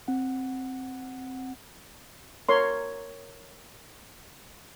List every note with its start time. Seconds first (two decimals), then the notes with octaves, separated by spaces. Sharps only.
0.08 C4 F#5
2.49 A#4 C#5 C6